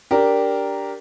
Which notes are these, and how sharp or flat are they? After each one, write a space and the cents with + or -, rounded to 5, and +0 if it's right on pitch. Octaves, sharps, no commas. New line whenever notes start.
D4 -10 G4 +0 A#4 +0